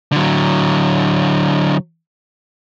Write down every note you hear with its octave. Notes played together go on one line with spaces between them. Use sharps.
D3 F#3